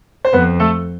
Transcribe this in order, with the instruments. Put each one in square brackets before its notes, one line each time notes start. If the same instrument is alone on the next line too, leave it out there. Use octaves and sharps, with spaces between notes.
[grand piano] C5
[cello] F2 [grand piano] B3 B4
[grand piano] A3 A4